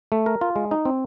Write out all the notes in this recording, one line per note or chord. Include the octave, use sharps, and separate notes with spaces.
A3
A#4
F4
G#3
D#4
C4